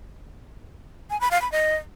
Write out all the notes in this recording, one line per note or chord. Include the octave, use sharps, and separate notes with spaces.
G#5
B5
F5
B5
D#5